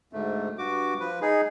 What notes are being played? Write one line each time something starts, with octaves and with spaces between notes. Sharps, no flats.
D2 G#2 A3
G2 F#4 D6
F3 B4
D#4 G#4